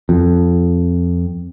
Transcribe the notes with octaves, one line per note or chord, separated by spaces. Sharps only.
F2